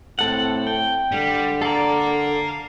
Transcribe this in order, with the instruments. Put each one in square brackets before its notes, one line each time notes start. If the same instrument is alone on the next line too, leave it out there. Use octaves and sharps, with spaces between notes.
[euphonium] A2 [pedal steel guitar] C4 A4 F#5
[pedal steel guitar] G5
[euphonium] D3 [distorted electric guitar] G3
[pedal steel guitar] A4 D5 [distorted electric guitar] F5 A#5